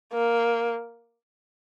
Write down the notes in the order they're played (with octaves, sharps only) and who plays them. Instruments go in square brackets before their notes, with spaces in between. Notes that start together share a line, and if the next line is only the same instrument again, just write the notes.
[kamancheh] A#3